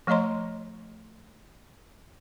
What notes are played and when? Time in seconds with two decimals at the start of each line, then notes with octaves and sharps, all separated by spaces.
0.07 F3 A3 C#5 D#5 A#5 C6